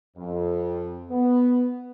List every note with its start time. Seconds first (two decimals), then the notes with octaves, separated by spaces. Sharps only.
0.17 F2
1.11 B3